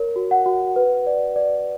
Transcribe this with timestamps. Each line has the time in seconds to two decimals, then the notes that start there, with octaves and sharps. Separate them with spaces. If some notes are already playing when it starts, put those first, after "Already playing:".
Already playing: A#4 C#5
0.16 F#4
0.31 F#5
0.46 F#4
0.76 B4
1.07 D5
1.36 D5